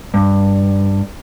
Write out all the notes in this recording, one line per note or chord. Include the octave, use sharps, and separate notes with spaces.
G2